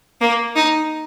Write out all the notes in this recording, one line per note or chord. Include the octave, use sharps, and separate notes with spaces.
A#3
D#4